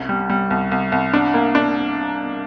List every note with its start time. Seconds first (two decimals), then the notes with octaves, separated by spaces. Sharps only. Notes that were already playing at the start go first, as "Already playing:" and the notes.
Already playing: C2 C#4
0.09 G3
0.30 G3
0.51 C2
0.72 C2
0.92 C2
1.13 D4
1.34 A#3
1.55 D4